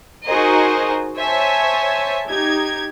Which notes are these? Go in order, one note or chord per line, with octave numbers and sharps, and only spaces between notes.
D#4 F#4 G#4 A#4 C5 D#5
C5 C#5 E5 G#5 A5
D#4 G4 G#6